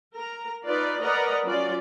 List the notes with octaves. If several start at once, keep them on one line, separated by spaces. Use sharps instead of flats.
A#4 A#5
D#4 F4 B4 D5
A#4 B4 D5 D#5 F#5 A#5
F#3 C#4 F4 D5